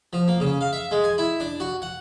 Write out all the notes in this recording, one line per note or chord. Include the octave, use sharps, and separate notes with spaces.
F3
A#3
C#3
F5
E5
G#3
G#5
E4
D4
F#4
F#5